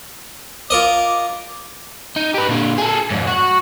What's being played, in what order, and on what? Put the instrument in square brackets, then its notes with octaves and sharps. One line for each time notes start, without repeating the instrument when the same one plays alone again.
[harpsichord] F4 A#4 D#5 [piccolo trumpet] D6
[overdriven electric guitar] D#4
G4 B4
A#2 D3
G#4 A4
F2 G#2
F#4